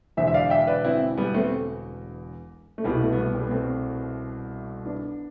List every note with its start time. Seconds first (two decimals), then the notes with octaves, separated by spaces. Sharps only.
0.17 E1 E2 D3 C5 E5
0.27 E5
0.34 D5 F5
0.50 E5 G5
0.67 B4 D5
0.85 C4 E4
1.17 G3 B3
1.34 A3 C4
2.78 A3
2.84 C2 B2 G3 B3
3.02 A3
3.12 B3
3.18 A3
3.35 G3 B3
3.47 B3
3.51 A3 C4
4.85 B3 D4